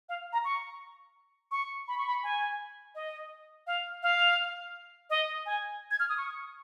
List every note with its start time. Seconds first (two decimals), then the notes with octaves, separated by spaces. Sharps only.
0.09 F5
0.33 A#5
0.44 C#6
1.51 C#6
1.88 B5
1.98 C#6
2.07 B5
2.23 G#5
2.95 D#5
3.67 F5
4.03 F5
5.10 D#5
5.46 G#5
5.91 G#6
6.00 F6
6.09 D#6
6.18 C#6